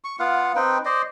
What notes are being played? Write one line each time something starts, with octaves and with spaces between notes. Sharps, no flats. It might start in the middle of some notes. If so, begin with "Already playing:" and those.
C#6
B3 F4 F5 F#5
C4 D#4 B4 G5
C5 D5 D#5